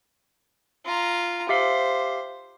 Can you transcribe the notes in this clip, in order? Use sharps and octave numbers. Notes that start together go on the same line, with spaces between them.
F4 A#5
G4 C5 E5 F5